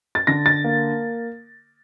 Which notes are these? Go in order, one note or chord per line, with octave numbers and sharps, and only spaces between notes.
A6
D3 A#6
A6
A#3